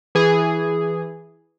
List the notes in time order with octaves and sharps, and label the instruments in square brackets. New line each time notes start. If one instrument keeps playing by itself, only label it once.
[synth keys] E3 G#4